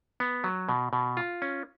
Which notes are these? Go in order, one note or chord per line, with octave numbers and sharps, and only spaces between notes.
B3
F#3
B2
B2
F4
C#4